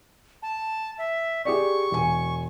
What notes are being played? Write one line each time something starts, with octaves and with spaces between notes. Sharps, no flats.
A5
E5
G4 G#4 D5 C#6
E1 G#5